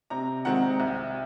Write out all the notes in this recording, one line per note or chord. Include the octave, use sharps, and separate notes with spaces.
C3 A#5
D#3 G#3 C4 F#5
C2